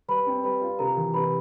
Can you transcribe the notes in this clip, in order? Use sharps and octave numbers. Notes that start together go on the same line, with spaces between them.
G3 B4 B5
C4
G3 B4 B5
F4
C3 A#4 A#5
E3
C3 B4 B5